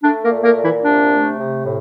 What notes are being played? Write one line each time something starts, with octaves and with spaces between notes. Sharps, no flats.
A3 D4
A#3 A#4
A#2
A#3 A#4
A#2
E3 E4
C3 D4
A3
C3
A2